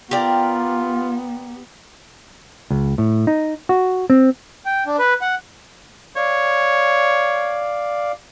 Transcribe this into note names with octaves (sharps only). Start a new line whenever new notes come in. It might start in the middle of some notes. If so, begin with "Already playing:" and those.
B3 F4 G4 A#4 D5
C#2
A2
D#4
F#4
C4
G5
D4
B4
F#5
C#5 D5 F5